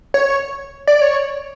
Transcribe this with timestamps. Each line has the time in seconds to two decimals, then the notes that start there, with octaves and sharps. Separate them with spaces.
0.14 C#5
0.87 D5
1.02 C#5